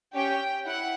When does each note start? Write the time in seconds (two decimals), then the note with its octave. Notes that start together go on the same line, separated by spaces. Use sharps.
0.14 C#4 G4 G5
0.66 E4 F#5